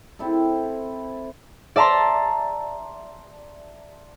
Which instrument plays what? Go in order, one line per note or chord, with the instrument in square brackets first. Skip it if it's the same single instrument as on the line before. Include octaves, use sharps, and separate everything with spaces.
[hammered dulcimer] C4 E4 A4
[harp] D5 E5 A5 A#5 C6